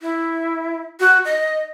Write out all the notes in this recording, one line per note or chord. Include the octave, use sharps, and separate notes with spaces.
E4
F#4
D#5